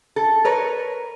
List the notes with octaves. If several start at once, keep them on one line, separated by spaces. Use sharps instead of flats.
A4
A#4 B4 C#5